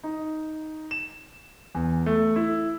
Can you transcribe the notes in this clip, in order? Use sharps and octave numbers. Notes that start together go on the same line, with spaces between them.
D#4
E7
E2
A3
E4